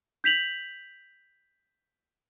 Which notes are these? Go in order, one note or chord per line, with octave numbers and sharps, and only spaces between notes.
G6 B6 F7 F#7